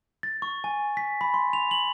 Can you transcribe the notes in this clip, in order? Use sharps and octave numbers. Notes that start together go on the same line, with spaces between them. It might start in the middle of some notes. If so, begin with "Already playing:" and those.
A6
C#6
G#5
B6
B5
C6
F7
F#7